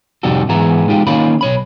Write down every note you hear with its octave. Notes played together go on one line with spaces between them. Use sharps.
F2 C3 G3 D#4 F#4 A4
G#2 E3 B3 G#4 E5 A#5
G#3 D#4 F4 G4
D#3 A#3 C#4 D#4 F4 B5
B1 C#5 B5